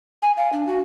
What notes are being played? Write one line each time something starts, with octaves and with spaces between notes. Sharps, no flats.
G#5
F5
D4
F#4